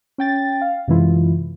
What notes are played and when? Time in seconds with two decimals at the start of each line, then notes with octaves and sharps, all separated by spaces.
0.18 C#4 G5 A6
0.61 F5
0.88 F#2 C3 E3 G#3 E4 F4